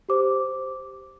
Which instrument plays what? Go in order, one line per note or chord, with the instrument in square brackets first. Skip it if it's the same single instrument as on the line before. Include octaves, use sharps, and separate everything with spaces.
[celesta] G4 C5 D6